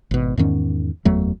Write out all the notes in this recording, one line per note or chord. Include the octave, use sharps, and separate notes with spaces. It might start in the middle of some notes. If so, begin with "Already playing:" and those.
G#1 B2
E2 G#2 D#3 C#4
F#1 E2 F#3 A3